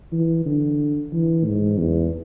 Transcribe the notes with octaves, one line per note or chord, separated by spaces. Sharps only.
E3
D3
E3
G#2
E2